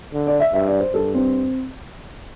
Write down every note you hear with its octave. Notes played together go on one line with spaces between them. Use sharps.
D3
D5
E5
G2 E5
D5
C5
G2 A4
C4